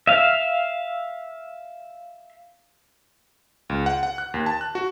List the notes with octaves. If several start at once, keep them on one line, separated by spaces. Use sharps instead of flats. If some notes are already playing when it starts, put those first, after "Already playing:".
E5 F5
C#2
F#5
F#5
F#6
D#2
A5
F#6
F#4